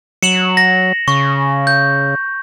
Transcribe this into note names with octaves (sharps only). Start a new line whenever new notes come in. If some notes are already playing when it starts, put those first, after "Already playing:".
F#3 C#7 E7 F#7
A#6
C#3 C#6
G6